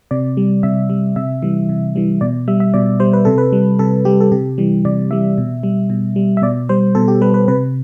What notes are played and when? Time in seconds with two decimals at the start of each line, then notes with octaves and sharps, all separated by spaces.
0.11 C3 D5
0.37 G3
0.63 C3 E5
0.90 G3
1.16 C3 E5
1.43 E3 G3
1.69 C3
1.96 E3 G3
2.21 B2 D5
2.48 G3 E5
2.60 E5
2.74 B2 D5
3.00 G3 C5
3.13 B4
3.25 C3 A4
3.38 B4
3.52 G3
3.79 C3 A4
4.05 G3 G4
4.20 A4
4.32 C3 G4
4.58 E3 G3
4.85 C3 D5
5.11 E3 G3 E5
5.38 B2
5.63 G3
5.90 B2
6.16 G3
6.37 E5
6.42 B2 D5
6.69 G3 C5
6.95 B2 A4
7.08 G4
7.21 G3 B4
7.34 B4
7.48 C3 B4